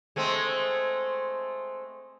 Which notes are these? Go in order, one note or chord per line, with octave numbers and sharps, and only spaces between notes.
G#3 A3 C4